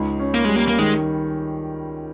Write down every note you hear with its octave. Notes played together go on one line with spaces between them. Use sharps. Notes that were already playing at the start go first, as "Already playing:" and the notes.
Already playing: C#2 D#4
C#4
A#3
G3 G#3
A#3
A#3
D#3 G#3